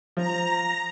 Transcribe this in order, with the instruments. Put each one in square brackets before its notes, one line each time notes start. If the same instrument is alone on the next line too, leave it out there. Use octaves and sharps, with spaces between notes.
[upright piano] F3 [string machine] A#5